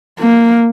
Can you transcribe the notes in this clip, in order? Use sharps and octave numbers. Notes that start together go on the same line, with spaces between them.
A#3